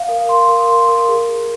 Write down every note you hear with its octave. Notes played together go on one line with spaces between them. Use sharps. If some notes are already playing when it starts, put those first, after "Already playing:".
Already playing: F5
A#4
C6
A#4
C6
A#4
G#4
G#4